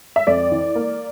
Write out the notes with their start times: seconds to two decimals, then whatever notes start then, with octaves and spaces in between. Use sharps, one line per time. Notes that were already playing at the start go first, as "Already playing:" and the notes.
0.16 E5
0.27 F2 D5
0.51 E3
0.75 A#3